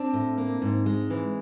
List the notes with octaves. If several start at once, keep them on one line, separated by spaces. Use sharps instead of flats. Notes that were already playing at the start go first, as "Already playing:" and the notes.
Already playing: C4 D4
A2
A#3
G#2
G#3
E3